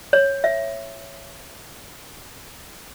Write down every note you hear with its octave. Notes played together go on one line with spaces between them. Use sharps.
C#5
E5